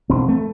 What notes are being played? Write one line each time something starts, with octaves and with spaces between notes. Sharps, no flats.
E1 C4
A3